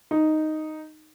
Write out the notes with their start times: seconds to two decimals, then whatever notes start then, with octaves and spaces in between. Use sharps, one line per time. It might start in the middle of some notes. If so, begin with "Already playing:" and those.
0.11 D#4